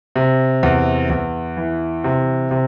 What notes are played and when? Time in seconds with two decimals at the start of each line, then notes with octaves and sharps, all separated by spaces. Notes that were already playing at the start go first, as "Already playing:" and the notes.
0.16 C3
0.63 E2
1.10 E2
1.57 E3
2.04 C3
2.51 C3